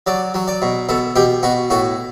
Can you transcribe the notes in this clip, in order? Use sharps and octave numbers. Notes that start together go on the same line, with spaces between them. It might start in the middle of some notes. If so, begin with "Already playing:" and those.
F#3 D5
F#3
D5
B2
B2 A4
B2 G4
B2 F#4
A2 F#4